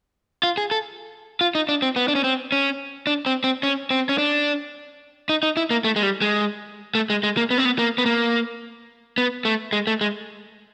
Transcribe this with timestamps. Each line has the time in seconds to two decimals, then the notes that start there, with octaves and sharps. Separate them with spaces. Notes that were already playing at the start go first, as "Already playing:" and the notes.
0.43 F4
0.58 G#4
0.71 A4
1.41 F4
1.55 D#4
1.69 D4
1.82 C4
1.96 B3
2.08 D4
2.15 C#4
2.24 C4
2.52 C#4
3.07 D4
3.26 C4
3.44 C4
3.63 C#4
3.91 C4
4.09 C#4
4.18 D4
5.29 D#4
5.43 D#4
5.57 E4
5.71 A#3
5.84 A3
5.96 G#3
6.03 G3
6.21 G#3
6.95 A3
7.10 G#3
7.23 G#3
7.37 A#3
7.51 B3
7.58 C4
7.65 B3
7.79 A#3
7.98 B3
8.06 A#3
9.18 B3
9.45 A3
9.73 G#3
9.87 A3
10.01 G#3